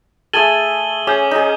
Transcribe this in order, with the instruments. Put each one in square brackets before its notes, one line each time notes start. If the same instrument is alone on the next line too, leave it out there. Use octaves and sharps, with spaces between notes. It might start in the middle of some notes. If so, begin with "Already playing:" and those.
[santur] A3 G#4 A4 [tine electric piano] G#5 A5 [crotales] D#7 F#7 G7
[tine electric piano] C#4 [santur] G#4 [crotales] D6 G6
[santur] D#4 G#4